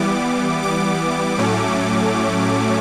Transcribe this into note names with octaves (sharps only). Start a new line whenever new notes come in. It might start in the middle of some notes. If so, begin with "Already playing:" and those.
Already playing: E3 G3 B3 D6
D6
A2 F#3 A3 C#4